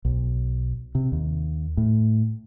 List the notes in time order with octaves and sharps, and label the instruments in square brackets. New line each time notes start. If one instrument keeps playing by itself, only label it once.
[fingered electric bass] B1
C3
D#2
A2